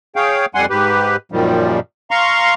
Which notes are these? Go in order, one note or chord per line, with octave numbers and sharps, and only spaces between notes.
G#4 C#5 F5 G5
F2 G3 F#5 G#5 C6
G#2 G4 B4
F#2 A#2 D#3 F3 G3
F5 A#5 C6 C#6